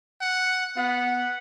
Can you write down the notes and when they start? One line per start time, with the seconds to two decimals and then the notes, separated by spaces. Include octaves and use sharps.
0.21 F#5
0.77 B3 F#5